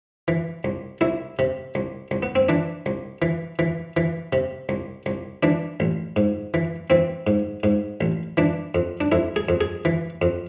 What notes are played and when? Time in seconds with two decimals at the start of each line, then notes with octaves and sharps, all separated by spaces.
0.28 E3
0.64 C2
1.01 C2 E4
1.39 C3
1.75 C2
2.11 C2
2.23 B3
2.35 C4
2.49 E3 D4
2.86 C2
3.22 E3
3.59 E3
3.97 E3
4.33 C3
4.69 C2
5.06 C2
5.43 E3 D4
5.80 A1
6.16 G#2
6.54 E3
6.90 E3 C4
7.27 G#2
7.63 G#2
8.01 A1
8.37 E3 D4
8.75 F2
9.01 D4
9.12 F2 E4
9.36 G#4
9.49 F2
9.61 G#4
9.85 E3
10.22 F2